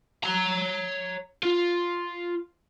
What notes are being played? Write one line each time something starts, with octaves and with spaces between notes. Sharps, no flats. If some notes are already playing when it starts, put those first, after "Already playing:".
C#5 A#5
F4